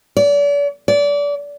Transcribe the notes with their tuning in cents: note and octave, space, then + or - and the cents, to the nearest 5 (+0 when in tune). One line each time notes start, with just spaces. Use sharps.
D5 -40
D5 -30